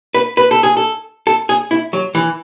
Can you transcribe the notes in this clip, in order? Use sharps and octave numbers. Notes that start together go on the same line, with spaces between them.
B4
B4
A4
G#4
A4
A4
G#4
E4
F#3
E3